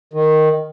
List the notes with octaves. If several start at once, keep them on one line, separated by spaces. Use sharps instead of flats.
D#3